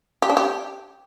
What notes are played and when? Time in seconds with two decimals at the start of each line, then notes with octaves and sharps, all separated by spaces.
0.22 G4
0.30 D4
0.37 G4